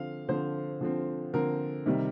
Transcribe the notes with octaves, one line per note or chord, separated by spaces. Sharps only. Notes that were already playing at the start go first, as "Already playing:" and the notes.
Already playing: D3 F3 C4 F5
D3 F3 C4 C5
D3 F3 C4
D3 F3 C4 A#4
C3 D#3 G3